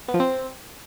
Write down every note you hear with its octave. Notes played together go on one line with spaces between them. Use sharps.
B3
F3
C4